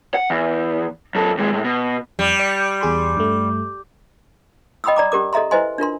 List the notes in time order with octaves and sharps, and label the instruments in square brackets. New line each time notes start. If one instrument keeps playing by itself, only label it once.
[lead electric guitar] F#5
E2
F#2 A4
D#2 G#3
A2 G#3
B2
[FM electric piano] F2 [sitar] G3
[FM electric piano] D5 C#7
E2 G#4 C6
G2 A3
[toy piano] D#5 G5 B5 C6 D#6 E6
D5 A#5 D6
C#4 G4 A#4 D6
A4 D#5 E5 A#5 C6
E4 B4 C5 D#5 G#5 C6
D4 F4 A#4 C6